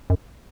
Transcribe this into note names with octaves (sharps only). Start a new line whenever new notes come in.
F#2